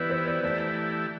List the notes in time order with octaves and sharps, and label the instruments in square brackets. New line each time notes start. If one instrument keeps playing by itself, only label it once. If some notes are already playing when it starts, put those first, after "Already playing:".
Already playing: [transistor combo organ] E3 B3 E4 G4 [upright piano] B4 D5
[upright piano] C5
D5
[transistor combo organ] E3 A3 E4 G4 [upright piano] D5